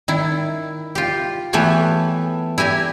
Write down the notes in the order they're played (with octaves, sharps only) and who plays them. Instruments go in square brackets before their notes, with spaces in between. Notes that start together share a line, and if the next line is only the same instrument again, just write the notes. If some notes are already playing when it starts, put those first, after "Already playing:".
[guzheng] D#3 E4
F4 G4
E3 A3 B3 G4 C#5
E4 G4 G#5 A#5